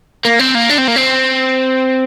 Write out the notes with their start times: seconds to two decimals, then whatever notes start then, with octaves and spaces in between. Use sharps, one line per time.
0.25 A#3
0.39 C4
0.55 A#3
0.70 D4
0.78 C4
0.88 A#3
0.96 C4